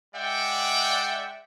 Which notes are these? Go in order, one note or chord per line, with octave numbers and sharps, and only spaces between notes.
G#3 D5 E5 F#5 G5